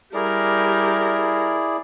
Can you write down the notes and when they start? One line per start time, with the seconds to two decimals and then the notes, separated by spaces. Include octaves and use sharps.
0.14 G3 E4 G#4 A#4 D5